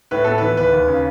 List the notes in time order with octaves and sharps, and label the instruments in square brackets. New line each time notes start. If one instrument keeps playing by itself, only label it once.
[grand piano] A2 [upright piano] B4
[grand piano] B3 [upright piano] A4
[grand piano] E3 [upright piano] B4
[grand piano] D#2 [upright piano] B4
[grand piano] D#2
C#3